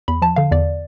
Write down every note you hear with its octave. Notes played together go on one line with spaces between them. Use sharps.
E2 B5
F3 A5
D3 F5
E2 D5